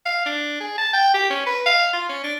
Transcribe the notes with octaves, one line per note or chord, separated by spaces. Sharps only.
F5
D4
G#4
A5
G5
G4
C#4
B4
F5
F4
C#4
D4